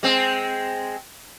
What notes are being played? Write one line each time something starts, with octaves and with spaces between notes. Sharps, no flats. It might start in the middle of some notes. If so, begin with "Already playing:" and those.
G#3 C4